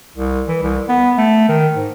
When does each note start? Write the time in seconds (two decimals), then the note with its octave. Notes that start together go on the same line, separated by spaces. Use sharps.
0.16 C2
0.48 E3
0.63 C2
0.89 B3
1.17 A3
1.49 D#3
1.76 G#2